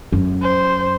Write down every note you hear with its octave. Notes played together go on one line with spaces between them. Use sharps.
F#2
C5